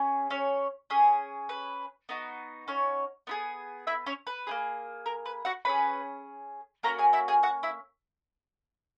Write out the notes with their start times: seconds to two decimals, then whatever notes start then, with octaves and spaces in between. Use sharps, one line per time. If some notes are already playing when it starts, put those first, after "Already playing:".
Already playing: C#4 G#4
0.30 C#4 C#5
0.90 C#4 G#4
1.49 B4
2.09 B3 D#4 F#4
2.68 C#4 C#5
3.27 B3 E4 G#4
3.87 E4 E5
4.06 C#4 C#5
4.27 B4
4.47 A#3 D#4 G#4
5.06 A#4
5.26 B4
5.45 F#4 F#5
5.65 C#4 G#4 B4 B5
6.83 A#3 C#4 F#4 A#4 A#5
6.98 G#4 G#5
7.13 E4 E5
7.28 G#4 G#5
7.43 F#4 F#5
7.63 E4 E5